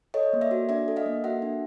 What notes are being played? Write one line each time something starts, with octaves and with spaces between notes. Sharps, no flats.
A4 C#5 D#5
A#3
D5 E5
F#4
D4 D5 E5
A4
D#5 F5
A#3
F#4 E5 F#5
D4